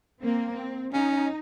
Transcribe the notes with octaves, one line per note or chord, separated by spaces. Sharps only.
A#3 C4
C4
C#4 D#4